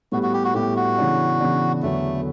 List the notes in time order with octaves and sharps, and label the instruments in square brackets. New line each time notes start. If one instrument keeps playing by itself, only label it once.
[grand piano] A2 G3 B3 [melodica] F#4
[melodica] F#4
G4
F#4
[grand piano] A2 G3 B3 [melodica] G4
[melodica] F#4
[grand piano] C#3 E3 B3 D4
C#3 E3 B3 D4
[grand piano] E2 D3 F#3 B3 [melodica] A3